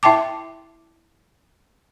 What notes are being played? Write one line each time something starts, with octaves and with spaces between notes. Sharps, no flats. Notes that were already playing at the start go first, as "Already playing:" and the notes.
E4 E5 G5 A5 D6